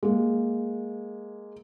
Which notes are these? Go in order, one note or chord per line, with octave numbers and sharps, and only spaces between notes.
G#3 A#3